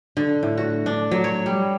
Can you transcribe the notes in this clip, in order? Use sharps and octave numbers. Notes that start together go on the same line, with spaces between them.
D3
A2
F#4
D4
F#3
C#5
G3